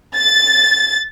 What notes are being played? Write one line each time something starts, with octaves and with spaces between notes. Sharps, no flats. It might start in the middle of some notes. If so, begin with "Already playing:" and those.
A6